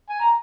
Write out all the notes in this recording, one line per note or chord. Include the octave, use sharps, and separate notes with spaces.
G#5
A#5